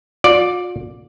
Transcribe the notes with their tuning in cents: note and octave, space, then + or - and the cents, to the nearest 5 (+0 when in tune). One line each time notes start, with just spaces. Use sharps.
F4 +40 D5 +0